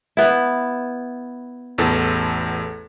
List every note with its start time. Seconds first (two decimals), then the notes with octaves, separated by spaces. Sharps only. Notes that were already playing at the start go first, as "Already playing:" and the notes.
0.17 B3 E4
1.78 A1 E2 A4